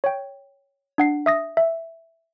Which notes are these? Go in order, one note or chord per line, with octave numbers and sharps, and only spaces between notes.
C#5 G5
D4 F#5 C7
E5 D#6 A#6
E5